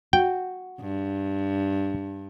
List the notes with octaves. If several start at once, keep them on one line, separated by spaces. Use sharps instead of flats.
F#4 G5
G2